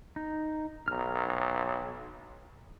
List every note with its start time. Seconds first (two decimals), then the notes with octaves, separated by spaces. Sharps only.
0.16 D#4
0.88 B1 A#5 F6